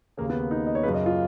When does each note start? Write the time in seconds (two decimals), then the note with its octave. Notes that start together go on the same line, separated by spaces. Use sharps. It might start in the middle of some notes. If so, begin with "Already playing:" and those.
0.17 D#2 C#3 A#3
0.30 B3
0.51 D#4
0.67 D#5
0.75 C#5
0.83 F#2 C#3 B4
0.94 D#5
1.06 F4